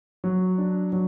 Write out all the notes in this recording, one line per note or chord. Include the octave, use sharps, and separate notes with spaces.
F#3
D4
F#3